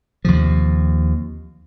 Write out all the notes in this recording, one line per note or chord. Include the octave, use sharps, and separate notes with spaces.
D#2 C3 F3